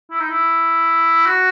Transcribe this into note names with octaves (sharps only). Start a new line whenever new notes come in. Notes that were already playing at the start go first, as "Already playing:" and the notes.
E4
D#4
E4
F#4